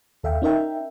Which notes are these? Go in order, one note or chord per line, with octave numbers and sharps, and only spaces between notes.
D#2 A4 E5 F5 G5
C#4 D#4 A#4 E5 G5